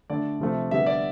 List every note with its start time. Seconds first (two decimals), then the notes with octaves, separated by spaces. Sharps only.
0.10 D3 A3 D4 D5
0.40 C3 F3 A3
0.71 D3 G3 B3 E5
0.86 D5